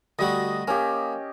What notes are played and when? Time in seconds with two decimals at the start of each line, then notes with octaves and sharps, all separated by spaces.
0.19 D2 G3 F#4 D#5
0.68 A#3 C#4 G4